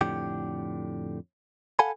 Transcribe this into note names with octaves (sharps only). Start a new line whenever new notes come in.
F2 A2 D3 G4
A4 F5 F#5 G#5 A5 B5